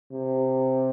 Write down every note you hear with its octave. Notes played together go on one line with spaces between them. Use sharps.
C3